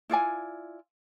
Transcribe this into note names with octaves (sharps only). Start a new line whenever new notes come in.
E4 F4 D5 G#5